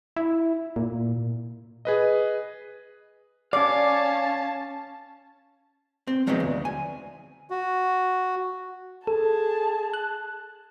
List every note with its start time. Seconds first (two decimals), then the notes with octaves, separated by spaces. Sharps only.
0.16 E4
0.76 A#2
1.85 G#4 B4 D#5
3.53 C#4 D5 F5 A5
6.07 C4
6.27 F3 F#3 G#3 B3 C4 D#4
6.40 D2
6.65 G#5
7.50 F#4
9.07 G#4 A4 A5
9.94 F#6